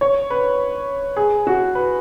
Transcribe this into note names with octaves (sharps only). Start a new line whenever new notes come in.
C#5
B4
G#4
F#4
B4